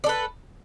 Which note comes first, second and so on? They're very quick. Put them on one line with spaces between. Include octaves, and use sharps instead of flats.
D5 A4 B4